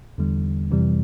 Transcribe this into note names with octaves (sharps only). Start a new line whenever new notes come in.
E2 D3 G3
F2 C3 E3 G3